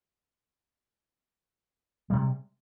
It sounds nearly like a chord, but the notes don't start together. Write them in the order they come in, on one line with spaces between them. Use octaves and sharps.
G3 C3 G#3